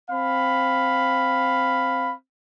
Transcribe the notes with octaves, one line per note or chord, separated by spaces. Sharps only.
C4 F5 B5